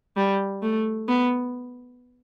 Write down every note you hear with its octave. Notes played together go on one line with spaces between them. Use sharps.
G3
A3
B3